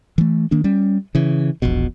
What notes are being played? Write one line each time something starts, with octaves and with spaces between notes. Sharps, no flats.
E3 A3
D#3 A#3 D4
G3 C#4
C#3 E3
E1 A#1 B2